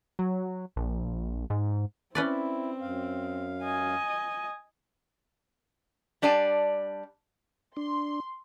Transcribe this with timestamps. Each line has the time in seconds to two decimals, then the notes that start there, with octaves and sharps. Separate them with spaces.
0.19 F#3
0.76 A#1
1.50 G#2
2.15 C4 C#4 E4 B4 D5
2.81 F#2 F5
3.63 D#5 G#5
6.22 G3 D4 D5 G#5 A5
7.77 D4 C6